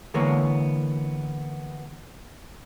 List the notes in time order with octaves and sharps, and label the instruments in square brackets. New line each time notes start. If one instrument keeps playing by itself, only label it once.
[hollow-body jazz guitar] D3 E3 G#3 A#3 B3 C#5